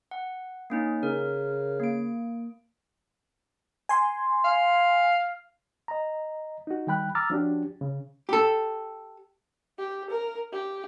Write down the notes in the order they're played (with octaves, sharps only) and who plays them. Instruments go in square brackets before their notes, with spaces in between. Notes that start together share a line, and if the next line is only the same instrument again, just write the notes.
[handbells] F#5
A#3 C#4 D#4
[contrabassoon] C#3 [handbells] A#4
[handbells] A#3 D7
[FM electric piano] G#5 C6
[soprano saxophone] F5
[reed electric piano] D#5 A#5
D#4 F#4
D#3 G3 G5 B5 F#6
A#5 D6 E6 F6 A6
F3 C#4 D4 F#4 G4
C#3
[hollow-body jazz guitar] G4 A4
[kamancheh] G4
A#4
G4